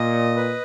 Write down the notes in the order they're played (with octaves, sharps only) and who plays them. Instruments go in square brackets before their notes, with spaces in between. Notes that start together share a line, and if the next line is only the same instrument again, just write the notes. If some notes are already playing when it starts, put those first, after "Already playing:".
Already playing: [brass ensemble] A#2 [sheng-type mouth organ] D#5
[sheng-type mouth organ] B4